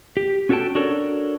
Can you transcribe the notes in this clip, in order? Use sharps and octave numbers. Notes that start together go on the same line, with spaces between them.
G4
C#4 F#4 A4 A#4 G5 A5
D4 F#4 A4 A#4 C#5